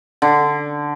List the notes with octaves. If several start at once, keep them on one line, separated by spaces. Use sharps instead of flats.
D3